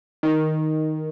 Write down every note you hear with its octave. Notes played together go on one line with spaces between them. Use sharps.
D#3